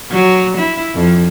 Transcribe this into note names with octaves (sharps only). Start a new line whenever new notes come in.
F#3
E4
F2